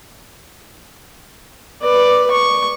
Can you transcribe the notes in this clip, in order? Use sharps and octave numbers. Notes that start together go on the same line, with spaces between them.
B4 D5
C#6